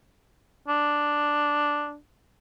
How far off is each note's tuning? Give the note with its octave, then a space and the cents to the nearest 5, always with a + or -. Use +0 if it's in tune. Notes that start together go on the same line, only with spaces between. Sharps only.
D4 +0